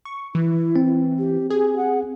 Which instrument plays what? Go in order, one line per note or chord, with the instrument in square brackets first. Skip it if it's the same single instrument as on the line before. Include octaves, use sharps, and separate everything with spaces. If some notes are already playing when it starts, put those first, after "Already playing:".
[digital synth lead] C#6
[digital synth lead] E3 [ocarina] E4
[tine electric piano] C4
[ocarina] G4
[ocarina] G4 [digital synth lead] G#4
[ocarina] F#5